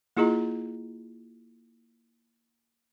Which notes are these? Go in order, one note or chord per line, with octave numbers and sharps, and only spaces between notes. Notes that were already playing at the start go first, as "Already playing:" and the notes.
A#3 E4 F4 G#4 D#5 A#5